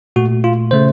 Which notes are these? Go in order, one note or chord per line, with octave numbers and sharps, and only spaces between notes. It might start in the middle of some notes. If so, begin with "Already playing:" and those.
A#2 A3 F#4
F4
C#3 A3 C5